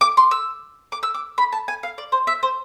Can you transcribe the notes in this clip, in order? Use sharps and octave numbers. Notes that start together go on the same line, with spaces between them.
D6
C6
E6
D6
E6
D6
B5
A5
G#5
F5
D5
C5
E5
C5